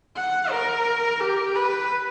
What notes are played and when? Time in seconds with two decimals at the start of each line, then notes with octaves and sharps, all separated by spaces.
0.16 F#5
0.51 A#4
1.20 G4
1.56 B4